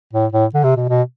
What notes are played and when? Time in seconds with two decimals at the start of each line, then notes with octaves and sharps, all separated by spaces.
0.13 A2
0.32 A2
0.54 D3
0.64 C3
0.76 B2
0.89 B2